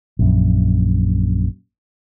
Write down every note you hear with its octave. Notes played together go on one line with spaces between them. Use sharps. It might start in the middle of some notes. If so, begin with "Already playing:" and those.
A#1 F#2